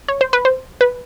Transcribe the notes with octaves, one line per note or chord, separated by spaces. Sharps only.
C#5
C5
B4
C5
B4